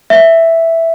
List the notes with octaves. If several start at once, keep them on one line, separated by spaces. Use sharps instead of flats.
E5